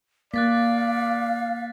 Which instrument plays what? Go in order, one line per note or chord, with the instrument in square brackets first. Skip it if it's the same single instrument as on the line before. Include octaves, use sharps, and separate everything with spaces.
[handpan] A#3 [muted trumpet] D5 [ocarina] F5 [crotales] F#6 A6 B6